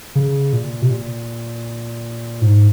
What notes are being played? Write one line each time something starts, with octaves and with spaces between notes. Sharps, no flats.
C#3
A#2
C3
A#2
G#2